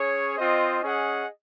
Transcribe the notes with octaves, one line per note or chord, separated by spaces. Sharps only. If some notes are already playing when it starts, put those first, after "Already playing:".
Already playing: C#4 G#4 C#5
C4 F4 C5 D#5
C#4 G#4 D#5 F#5